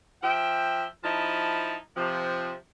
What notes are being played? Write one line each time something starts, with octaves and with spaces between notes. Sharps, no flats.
F3 E5 G5
F3 D#4 E4 A5 B5
C3 F3